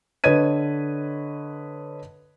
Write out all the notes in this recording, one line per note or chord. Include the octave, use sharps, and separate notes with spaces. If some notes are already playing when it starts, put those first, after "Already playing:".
D3 B4 C#5 D#5 G#6 D#7